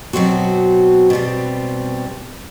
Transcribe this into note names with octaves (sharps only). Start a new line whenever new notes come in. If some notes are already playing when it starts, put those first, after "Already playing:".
B2 F#3 C4 F#4
B2 G3 C4